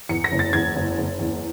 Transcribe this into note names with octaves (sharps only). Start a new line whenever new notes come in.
E2 C#7
A#6
F#1
A6
E2 G#6
F#1
F#1
E2